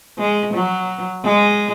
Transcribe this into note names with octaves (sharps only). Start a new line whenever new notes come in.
G#3
F#3
G#3